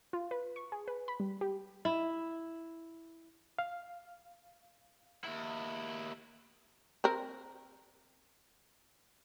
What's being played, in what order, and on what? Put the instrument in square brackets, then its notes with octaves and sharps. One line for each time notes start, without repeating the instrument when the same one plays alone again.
[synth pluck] F4
B4
C#6
G#4
B4
B5
G3
G4
[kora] E4
[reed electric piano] F5
[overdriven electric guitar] D#2 E4
[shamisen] C4 A#4